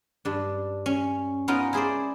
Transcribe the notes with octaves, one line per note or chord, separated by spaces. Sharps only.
G2 D4
C#4
B3 C#4 D#4 F4 A#4
E4 G#4 C5 D5